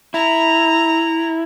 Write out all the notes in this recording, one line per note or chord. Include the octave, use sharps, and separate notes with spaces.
E4 A#5